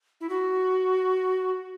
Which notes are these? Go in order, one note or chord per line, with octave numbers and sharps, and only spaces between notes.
E4
F#4